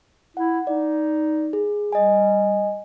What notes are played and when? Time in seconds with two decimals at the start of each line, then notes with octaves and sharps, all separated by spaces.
0.37 E4 F#5
0.67 D#4 D5
1.53 G#4
1.92 G3 D#5 G#5